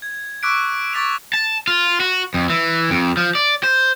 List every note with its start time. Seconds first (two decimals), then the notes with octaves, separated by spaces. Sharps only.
0.02 G#6
0.43 C#6 D6 E6 F#6 B6 D7
0.93 C#6 D6 A6 B6 D7 F7
1.34 A5
1.68 F4
2.00 F#4
2.34 F2
2.50 E3
2.90 F2
3.17 F3
3.35 D5
3.63 C5